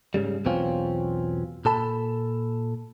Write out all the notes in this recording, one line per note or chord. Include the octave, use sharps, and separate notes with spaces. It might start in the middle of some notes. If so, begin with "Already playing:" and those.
G#2 C#3 G3
B1 E2 B2 C4 C#4 F4
A#2 A4 A5 B5